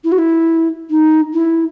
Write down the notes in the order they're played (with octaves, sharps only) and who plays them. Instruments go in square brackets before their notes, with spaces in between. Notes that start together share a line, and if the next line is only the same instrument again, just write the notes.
[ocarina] E4
F#4
E4
D#4
E4